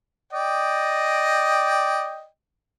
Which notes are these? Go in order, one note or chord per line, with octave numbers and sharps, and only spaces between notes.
D5 D#5 G5